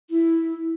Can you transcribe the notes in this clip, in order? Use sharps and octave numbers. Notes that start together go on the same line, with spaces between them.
E4